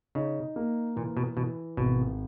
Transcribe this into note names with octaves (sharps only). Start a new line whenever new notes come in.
C#3 D#4
A#3
A#2 E3
B2
B2 E3
G#1 B2